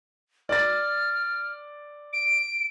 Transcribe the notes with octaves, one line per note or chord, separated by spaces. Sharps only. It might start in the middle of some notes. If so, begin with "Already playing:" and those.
D5 F6 A6
D7